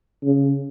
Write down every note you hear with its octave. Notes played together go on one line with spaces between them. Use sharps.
C#3